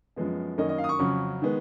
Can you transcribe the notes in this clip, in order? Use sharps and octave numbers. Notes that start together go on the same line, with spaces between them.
F#2 F3 G#3 B3
F#2 D#3 A#3 C#4 D#5
D#5
F5
D#6
C#6
F2 C#3 F#3 C#4
D#3 G#3 B3